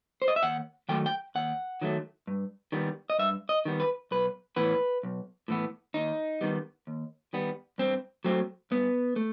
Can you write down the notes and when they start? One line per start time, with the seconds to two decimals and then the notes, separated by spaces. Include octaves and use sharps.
0.22 C5
0.28 D#5
0.36 E5
0.43 D#2 F#5
0.89 D#3 F#3 A3 G5
1.06 G5
1.35 D#2 F#5
1.81 D#3 F#3 A3
2.27 G2
2.72 D#3 G3 B3
3.10 D#5
3.19 G2 E5
3.49 D#5
3.65 D#3 G3 B3
3.80 B4
4.11 B1 B4
4.56 A2 E3 B3 B4
5.03 B1
5.48 A2 E3 B3
5.94 D#2 D#4
6.41 D#3 G3 B3
6.87 D#2
7.33 D#3 G3 B3
7.78 G2 C4
8.24 F#3 A3 C4
8.71 G2 B3
9.16 A3